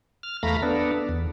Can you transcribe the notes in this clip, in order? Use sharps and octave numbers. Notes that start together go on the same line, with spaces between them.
F6
E2 A3 F5 A#5 B5
B3 D4 A4
E2